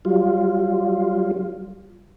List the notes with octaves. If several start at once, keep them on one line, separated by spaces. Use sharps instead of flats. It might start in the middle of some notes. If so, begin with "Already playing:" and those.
F#3 G3 F4